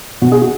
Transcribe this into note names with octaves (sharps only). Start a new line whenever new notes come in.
B2 F#4
G#4
F#4